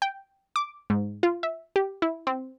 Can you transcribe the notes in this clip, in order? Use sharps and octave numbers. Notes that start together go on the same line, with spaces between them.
G5
D6
G#2
F4
E5
G4
E4
C4